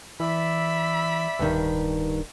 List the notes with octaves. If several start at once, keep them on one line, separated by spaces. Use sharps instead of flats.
E3 D5 E5 B5
D1 G2 D#3